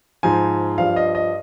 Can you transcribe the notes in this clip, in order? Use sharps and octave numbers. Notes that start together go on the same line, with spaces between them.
G#2 F3 G#5
G2 F3 F5
D#5
D#5